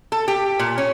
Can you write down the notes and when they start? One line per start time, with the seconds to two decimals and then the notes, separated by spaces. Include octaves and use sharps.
0.12 A4
0.28 G4
0.59 A#2
0.78 C#4